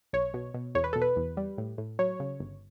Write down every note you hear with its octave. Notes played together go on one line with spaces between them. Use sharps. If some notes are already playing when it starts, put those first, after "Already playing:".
B1 C#5
B2
B2
E2 C#5
B4
B2 A4
B4
E2
G3
A2
A2
F#3 C#5
C#3
G1